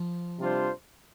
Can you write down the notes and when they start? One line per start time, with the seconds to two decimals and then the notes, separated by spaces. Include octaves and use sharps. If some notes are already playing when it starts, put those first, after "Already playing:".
Already playing: F3
0.39 C3 G3 D4 F4 C5